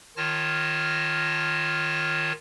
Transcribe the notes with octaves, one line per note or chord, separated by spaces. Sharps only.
D#3 F4 C#5 A5 F6 A#6